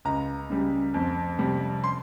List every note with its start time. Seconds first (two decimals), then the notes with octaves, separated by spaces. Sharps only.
0.05 C#2 A#5
0.50 C#3 G3
0.94 F2
1.39 C3 G3
1.84 C6